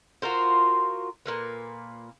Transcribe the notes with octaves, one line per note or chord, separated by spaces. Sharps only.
F4 F#4 A#4 C5
A#2 A#3 B4